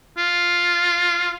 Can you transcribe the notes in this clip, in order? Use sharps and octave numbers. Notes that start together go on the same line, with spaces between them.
F4